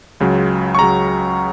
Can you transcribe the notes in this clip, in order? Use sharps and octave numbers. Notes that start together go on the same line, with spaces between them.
C#2 C#3 F#3
C#6
C#2 C#3 F#3 A#5